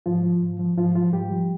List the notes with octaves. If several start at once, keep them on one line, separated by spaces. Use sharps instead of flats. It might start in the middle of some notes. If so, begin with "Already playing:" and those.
G#2 F3 F4
F3
G#2
F3
G#2 F3 F4
F3 F4
G#2 G3 G4
F3